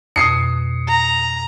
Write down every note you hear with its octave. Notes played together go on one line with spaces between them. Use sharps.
F2 B2 D#6 C7 C#7
A#5